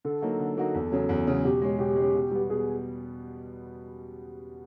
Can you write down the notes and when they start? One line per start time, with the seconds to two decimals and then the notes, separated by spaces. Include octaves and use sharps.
0.05 D3 A4
0.22 F#3 A#3 D#4 F#4
0.39 D3
0.57 F#3 A#3 D#4 F#4
0.74 E2
0.92 C#3 F#3
1.09 E2
1.27 C#3 F#3
1.44 B2 G4
1.62 G#3 C#4
1.79 B2 G4
1.96 G#3 C#4
2.15 B2
2.31 G3 B3
2.49 B2 G#4